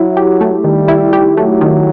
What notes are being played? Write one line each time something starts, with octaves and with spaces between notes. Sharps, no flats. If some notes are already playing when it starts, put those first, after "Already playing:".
Already playing: F#3 E4
G4
A3
D#3 G3
E4
G4
F#3 A3
D#3